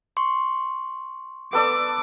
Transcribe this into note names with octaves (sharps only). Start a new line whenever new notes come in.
C6 C#6
B3 A4 D5 D6